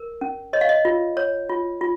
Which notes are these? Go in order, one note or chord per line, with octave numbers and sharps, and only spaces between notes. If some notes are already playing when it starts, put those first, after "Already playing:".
Already playing: A#4
C#4
C#5 D#5
F5
D#5
F4
C#5
F4
F4